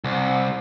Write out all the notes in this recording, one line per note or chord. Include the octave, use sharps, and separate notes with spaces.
C2